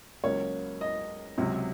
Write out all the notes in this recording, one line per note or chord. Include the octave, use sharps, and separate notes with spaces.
C#2 C#3 F#3 A#3 C#5
D#5
C#2 C3 F#3